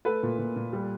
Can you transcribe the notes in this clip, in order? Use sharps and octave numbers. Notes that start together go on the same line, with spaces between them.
A3 A4 B4
A#2
A#2
A#2
G3